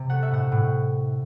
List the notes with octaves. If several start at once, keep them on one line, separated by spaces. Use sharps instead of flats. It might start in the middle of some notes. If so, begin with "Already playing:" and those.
Already playing: C3
A3 F#5
E5
A2 F#5
A2